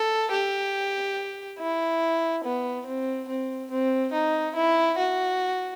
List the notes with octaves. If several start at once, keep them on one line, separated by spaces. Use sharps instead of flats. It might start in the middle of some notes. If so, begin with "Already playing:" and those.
Already playing: A4
G4
E4
B3
C4
C4
C4
D#4
E4
F#4